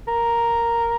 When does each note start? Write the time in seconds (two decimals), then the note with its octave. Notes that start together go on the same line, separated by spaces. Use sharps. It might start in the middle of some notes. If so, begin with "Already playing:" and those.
0.08 A#4